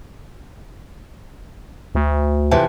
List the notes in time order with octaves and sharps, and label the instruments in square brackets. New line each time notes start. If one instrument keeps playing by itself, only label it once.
[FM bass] D2
[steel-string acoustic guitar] F2 C3 E3